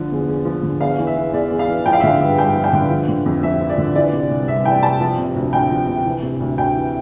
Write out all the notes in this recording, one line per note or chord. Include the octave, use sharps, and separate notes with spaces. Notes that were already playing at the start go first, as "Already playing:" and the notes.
Already playing: D3 F3
E2
E2
F3
D3
E2 F5
E3
E5
E3
E2 D5
E2
F5
E3
F3 G5
F5
E5
D3 F5
G2
G2 G5
F3
G5
D3
F3
D3
F2
F2 E5
F3
D5
D3
E3 D5
C3
C2
C2 E5
E3 G5
C3 A5
F3
C3
D2
D2 G5
F3
C3
E3
C3
D2
D2 G5
E3